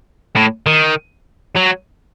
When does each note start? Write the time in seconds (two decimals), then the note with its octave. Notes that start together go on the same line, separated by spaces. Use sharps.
0.36 A2
0.67 D#3
1.56 F#3